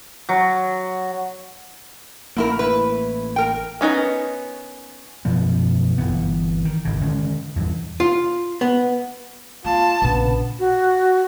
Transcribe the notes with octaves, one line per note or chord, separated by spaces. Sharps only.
F#3
A1 F#2 A3 A#3 E4 A#4
E4 B4
A#4 G5
B3 C#4 D#4 A#4
F#2 B2 F3 B3
G1 E3 B3
D#3
G#1 C#3
D3 D#3 G#3 C#4
E2 G2 E3
F4
B3
A#3 F4 A5
A#1 C#3 B3
F#4